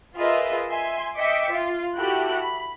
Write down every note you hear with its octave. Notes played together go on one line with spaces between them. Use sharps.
F4 G#4 A#4 B4 D#5 E5
E5 G#5 C6
D#5 E5 G5 D6 B6 C#7
F4
E4 F#4 G4 A4 G5 F#6
B5